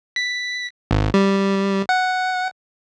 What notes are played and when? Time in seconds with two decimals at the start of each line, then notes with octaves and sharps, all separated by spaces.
0.16 B6
0.91 G#1
1.14 G3
1.89 F#5